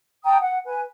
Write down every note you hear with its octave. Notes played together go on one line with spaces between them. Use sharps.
G5 A5 A#5 D#6
F#5
B4 G#5